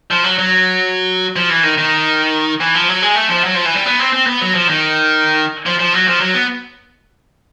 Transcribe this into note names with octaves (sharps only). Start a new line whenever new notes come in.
F3
F#3
F#3
F3
E3
D#3
D#3
E3
F3
F#3
G#3
A3
F3
F#3
F3
E3
G3
B3
C4
C4
B3
F#3
F3
D#3
F3
F3
F#3
F3
F#3
B3